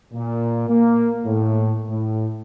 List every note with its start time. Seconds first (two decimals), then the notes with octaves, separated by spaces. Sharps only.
0.13 A#2
0.69 A#3
1.24 A2
1.89 A2